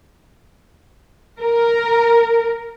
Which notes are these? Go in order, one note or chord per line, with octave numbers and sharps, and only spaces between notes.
A#4